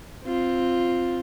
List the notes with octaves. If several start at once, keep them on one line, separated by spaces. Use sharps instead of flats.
C4 F4